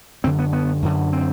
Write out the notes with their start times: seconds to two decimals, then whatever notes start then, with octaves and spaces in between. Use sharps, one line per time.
0.24 F#2 D3 C4
0.39 B3
0.53 B3
0.82 F#2 D3
1.13 C4